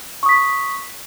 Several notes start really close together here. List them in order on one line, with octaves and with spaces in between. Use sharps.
C#6 D#6 B6